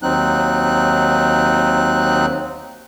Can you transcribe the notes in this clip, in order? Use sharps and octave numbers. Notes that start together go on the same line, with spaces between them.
D#2 F#3 C4 D#4 F#6